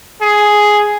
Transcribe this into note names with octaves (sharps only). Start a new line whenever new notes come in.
G#4